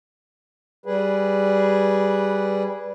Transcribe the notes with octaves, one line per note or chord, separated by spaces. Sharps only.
G3 G#4 B4